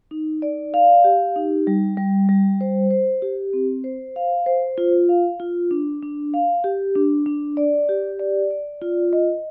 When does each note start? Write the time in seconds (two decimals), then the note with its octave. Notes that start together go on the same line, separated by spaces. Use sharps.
0.11 D#4
0.42 D5
0.74 F5
1.04 G4
1.36 D#4
1.67 G3
1.97 G3
2.29 G3
2.61 C5
2.91 C5
3.22 G4
3.53 C4
3.84 C5
4.16 F5
4.46 C5
4.78 F4
5.09 F5
5.40 F4
5.71 D4
6.03 D4
6.34 F5
6.64 G4
6.95 D4
7.26 D4
7.57 D5
7.89 G4
8.20 D5
8.51 D5
8.82 F4
9.13 D#5